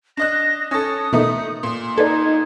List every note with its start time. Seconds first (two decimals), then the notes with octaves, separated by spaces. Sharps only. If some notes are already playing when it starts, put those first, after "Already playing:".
0.17 D4 D#5 F#6 A#6
0.71 C#4 A4 D#6
1.13 B2 E3 A3 A#3 D#4
1.63 A#2
1.98 D#4 A4 B4 D5 G#6